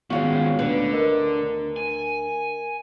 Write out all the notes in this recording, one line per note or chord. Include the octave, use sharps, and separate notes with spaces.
D#3 G#3 B3 C#4 F4 F#4
D2 D3 B4
A#4 D#5
G#5